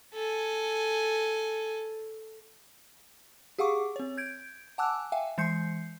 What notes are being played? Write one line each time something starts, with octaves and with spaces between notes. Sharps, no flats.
A4 G#5
G4 G#4 F5 F#5 C#6 D6
C4 C#5
G6 G#6 D7
F#5 G#5 A5 D6 E6 F#6
E5 F5 G5 G#5
E3 G#3 C6 G6 C7 C#7